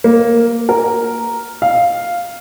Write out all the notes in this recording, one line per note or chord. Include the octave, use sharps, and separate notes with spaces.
A#3
A#4
F5